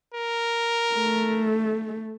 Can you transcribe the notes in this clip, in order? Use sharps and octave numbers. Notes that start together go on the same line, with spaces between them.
A#4
A3